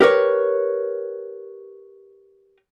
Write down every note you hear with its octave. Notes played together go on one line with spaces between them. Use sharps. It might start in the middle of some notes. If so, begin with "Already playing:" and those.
G4 A#4 B4 C#5